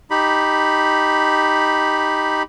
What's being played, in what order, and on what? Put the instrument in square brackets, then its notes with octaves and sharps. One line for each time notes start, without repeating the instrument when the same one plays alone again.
[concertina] D#4 G4 B5